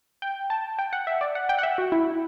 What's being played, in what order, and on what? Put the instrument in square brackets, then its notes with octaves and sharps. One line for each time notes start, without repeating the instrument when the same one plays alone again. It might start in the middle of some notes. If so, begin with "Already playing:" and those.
[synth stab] G5
A5
G5
F#5
E5
D5
F#5
G5
F#5
E5
F#4
E4